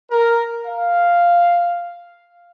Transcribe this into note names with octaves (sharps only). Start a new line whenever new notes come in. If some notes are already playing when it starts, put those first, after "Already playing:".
A#4
F5